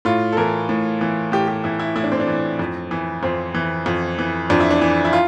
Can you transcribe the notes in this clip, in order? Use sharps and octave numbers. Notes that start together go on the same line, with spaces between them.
A2 F4
A4
E3 A#4
A2
E3
A2 G4
G4
E3 E4
E4
A2 E4
D4
C4
D4
E3
F2
E3
F2 C4
E3
F2
E3
F2 D4
E4
D4
E3
E4
F4